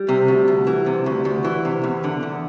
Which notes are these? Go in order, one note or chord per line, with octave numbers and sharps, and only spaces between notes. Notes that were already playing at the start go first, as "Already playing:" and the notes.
Already playing: G3
C3
D2
D2
E3
C3
D2
D2
E3
C3
E2
D3
E2